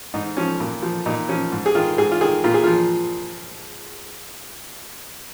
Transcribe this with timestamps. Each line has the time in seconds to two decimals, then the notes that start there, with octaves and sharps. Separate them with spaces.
0.14 G#2 D#4
0.37 F3 C#4
0.60 A#2
0.82 F3
1.06 A#2 D#4
1.29 F3 C#4
1.52 G#2
1.66 G#4
1.75 D#3 F4
1.98 G#2 G#4
2.12 F4
2.21 D#3 G#4
2.44 A#2 F4
2.54 G#4
2.64 F3 F4